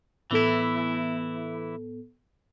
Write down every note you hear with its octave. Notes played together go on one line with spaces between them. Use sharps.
A2 E3 B3 E4 A4